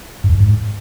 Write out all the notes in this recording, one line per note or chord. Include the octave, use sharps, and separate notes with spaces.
G2
E2
F2
G#2